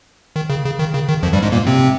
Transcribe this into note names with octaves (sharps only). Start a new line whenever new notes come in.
D#3
C#3
C#3
D#3
C#3
D#3
F2 F3
G2 G3
G#2 G#3
A#2 A#3
C3 C4